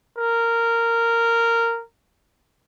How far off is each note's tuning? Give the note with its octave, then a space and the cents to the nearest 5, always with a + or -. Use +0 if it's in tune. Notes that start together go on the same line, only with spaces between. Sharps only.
A#4 -10